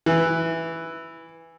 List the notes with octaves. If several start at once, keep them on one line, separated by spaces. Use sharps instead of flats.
E3